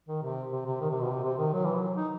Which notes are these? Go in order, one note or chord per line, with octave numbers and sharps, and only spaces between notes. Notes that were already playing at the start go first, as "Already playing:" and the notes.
D#3
C3
C3
C3
D#3
C3
B2
C3
C3
D#3
F#3
E3
F#3
D#4